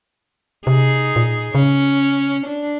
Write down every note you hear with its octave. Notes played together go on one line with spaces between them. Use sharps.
C3 D#4 G#4
A#2
C#3 C#4
D4